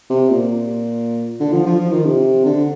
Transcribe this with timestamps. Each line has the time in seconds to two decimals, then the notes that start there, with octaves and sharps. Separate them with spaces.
0.10 C3
0.30 A#2
1.40 D3
1.53 F3
1.67 F3
1.80 F3
1.93 D#3
2.05 C3
2.46 D3